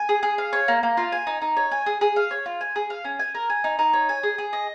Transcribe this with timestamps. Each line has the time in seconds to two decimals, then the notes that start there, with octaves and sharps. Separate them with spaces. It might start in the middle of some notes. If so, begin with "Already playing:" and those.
Already playing: G#5
0.09 G#4
0.23 G#4
0.38 F5
0.53 C#5
0.68 A#3
0.83 A#3
0.97 F4
1.12 G#5
1.27 D#4
1.42 D#4
1.57 C#5
1.71 G#5
1.86 G#4
2.01 G#4
2.16 F5
2.31 C#5
2.46 F4
2.61 G#5
2.76 G#4
2.90 F5
3.05 C#4
3.19 G#5
3.35 A#4
3.50 G#5
3.64 D#4
3.79 D#4
3.93 C#5
4.09 G#5
4.23 G#4
4.38 G#4
4.53 D#5